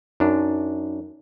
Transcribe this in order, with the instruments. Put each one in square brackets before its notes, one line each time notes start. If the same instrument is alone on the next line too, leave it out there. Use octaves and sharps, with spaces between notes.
[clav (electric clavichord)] F#2 D4 [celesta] D#4